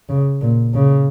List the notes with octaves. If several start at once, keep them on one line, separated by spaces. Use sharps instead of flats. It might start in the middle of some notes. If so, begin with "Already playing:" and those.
C#3
A#2
C#3